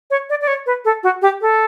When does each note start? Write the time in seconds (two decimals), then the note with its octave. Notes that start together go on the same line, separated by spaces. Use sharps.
0.10 C#5
0.30 D5
0.41 D5
0.48 C#5
0.66 B4
0.85 A4
1.03 F#4
1.22 G4
1.41 A4